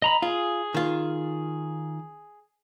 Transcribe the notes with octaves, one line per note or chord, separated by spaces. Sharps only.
D#5 A#5 B5
F4 G#4
D#3 F4